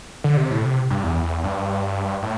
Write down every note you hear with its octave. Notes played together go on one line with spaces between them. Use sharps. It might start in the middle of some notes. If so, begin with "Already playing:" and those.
D3
C3
A2
C3
G2
E2
G2
A2